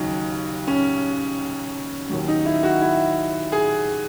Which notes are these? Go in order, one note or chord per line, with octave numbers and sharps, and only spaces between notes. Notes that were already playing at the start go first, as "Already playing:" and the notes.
Already playing: D#2 C#3 F#3 D#4
C#4
D#2 D#3 F#3
D#4
E4
F#4
E4
G#4